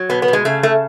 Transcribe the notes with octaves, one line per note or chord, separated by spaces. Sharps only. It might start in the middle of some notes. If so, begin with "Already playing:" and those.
Already playing: F#3
B2 B3
B3
B2
G#3
C#3 A3
A3